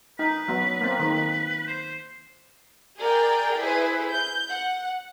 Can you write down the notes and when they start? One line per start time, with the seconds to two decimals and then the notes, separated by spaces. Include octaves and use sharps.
0.19 D#4 B4
0.48 F#3 B3
0.81 A#3 C4
0.99 D#3
1.67 C5
2.98 G#4 A#4 D5 G5
3.61 E4 G#4 B4 C5
4.10 G6
4.49 F#5